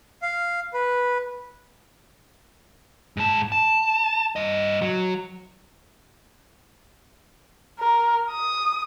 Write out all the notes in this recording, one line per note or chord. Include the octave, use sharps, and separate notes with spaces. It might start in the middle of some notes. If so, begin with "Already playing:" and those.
F5
B4
G#2 A5
A5
G2 D#5
F#3
A#4
D#6